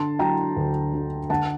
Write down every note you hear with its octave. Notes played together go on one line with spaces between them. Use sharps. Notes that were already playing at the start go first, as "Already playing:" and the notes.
Already playing: D3 A5 C6
F#3 G5 A#5
D2
D3
D3 F#5 A5